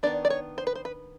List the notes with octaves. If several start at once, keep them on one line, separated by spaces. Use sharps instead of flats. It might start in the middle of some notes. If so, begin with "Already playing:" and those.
D#3 F#3 B3 D4 D5
D5
C#5
C5
B4
C5
B4